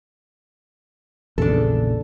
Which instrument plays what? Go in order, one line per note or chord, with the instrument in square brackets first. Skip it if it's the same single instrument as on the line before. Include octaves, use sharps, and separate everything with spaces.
[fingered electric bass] A#1 A#2 C#3 [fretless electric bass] E2 [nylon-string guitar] D4 A4